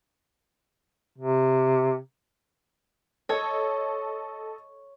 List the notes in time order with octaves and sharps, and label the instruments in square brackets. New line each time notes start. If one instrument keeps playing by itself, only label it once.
[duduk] C3
[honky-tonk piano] A4 D#5 [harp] C#5